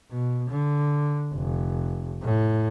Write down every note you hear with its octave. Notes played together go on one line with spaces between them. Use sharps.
B2
D3
F1
A2